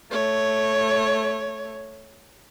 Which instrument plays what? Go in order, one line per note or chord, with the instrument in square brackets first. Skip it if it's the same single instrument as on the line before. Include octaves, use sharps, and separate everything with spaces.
[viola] A3 C#5